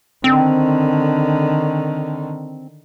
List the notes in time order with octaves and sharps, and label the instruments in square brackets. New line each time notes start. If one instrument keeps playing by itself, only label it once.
[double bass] D3 D#3 [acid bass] C4